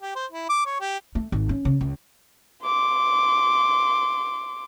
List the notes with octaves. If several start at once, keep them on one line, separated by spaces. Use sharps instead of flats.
G4
C5
E4
D6
C#5
G4
A3
G#1
C#4
C#3
C#2
C6 D6